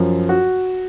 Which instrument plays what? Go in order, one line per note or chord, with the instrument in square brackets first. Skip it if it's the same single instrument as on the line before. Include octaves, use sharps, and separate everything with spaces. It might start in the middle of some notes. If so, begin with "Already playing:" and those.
Already playing: [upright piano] F#2 F3
F#4